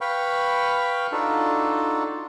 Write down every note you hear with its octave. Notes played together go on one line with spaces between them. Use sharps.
B4 F5 G5 B5 C#6
D4 D#4 F4 F#4 A4